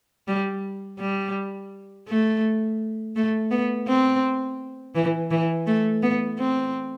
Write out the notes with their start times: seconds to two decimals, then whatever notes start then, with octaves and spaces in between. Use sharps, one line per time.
0.28 G3
0.99 G3
2.08 A3
3.16 A3
3.51 B3
3.88 C4
4.95 E3
5.31 E3
5.67 A3
6.02 B3
6.39 C4